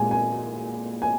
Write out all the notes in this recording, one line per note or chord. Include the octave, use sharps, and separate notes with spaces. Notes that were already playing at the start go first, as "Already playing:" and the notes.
Already playing: A#2 G#3 G#5
G#5
G#5